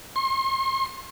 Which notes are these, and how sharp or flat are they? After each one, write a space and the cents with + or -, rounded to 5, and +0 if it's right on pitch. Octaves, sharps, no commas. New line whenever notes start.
C6 +40